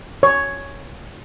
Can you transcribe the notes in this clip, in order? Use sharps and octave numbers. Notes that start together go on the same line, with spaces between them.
C#5